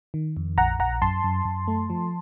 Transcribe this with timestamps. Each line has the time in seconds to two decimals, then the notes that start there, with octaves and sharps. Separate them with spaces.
0.14 D#3
0.37 F2
0.58 A#1 F#5 A#5
0.79 A#1 F#5 A#5
1.02 F#2 A5 C6
1.24 F#2
1.45 F#2
1.68 A3
1.90 F3